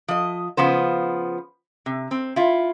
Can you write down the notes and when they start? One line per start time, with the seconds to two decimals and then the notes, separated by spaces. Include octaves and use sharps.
0.08 F3 D#5
0.57 C#3 F3 B3 C5
1.86 C3
2.11 C4
2.36 E4 F4